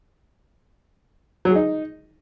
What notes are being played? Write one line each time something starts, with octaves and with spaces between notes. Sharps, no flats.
F#3
G#4
D#4